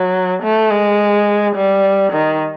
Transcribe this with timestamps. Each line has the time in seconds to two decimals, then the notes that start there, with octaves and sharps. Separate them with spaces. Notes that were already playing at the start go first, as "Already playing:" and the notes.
Already playing: F#3
0.43 A3
0.71 G#3
1.56 G3
2.12 D#3